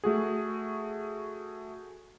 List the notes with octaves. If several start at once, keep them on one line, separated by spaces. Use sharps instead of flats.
A3 F#4 G#4